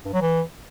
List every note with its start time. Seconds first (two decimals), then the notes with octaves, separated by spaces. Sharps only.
0.05 G2
0.13 F#3
0.22 E3